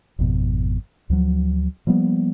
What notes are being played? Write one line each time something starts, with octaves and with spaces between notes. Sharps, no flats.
G#1 F2 B2
D2 F3 F#3
F3 G3 A#3 B3